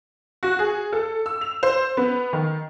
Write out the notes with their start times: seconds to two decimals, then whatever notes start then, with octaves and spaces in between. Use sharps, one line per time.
0.43 F#4
0.59 G#4
0.93 A4
1.26 E6
1.41 F7
1.63 C5
1.97 B3
2.33 D#3